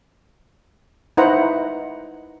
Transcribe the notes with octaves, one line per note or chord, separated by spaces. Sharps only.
D#4 E4 B4 C5 F#5 A#5